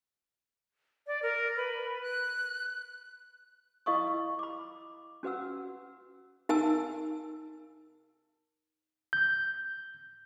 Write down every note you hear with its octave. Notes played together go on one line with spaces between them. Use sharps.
D5
A#4
B4
F#6
E4 A#4 D#5 F5 C#6 D#6
B5 D6
C#4 F#4 B4 F#5 E6
D#4 A#4 G#5 E6
G6